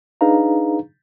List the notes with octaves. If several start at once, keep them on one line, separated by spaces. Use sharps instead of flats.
D4 D#4 G#4 B4 F5 A#5